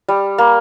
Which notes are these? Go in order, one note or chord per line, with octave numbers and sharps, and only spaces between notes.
G3
A#3